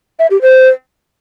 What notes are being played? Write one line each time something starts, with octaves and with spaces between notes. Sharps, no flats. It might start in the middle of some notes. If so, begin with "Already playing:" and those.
E5
G4
C5